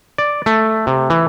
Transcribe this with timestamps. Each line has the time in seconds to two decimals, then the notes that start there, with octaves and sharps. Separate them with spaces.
0.18 D5
0.46 A3
0.87 C3
1.10 E3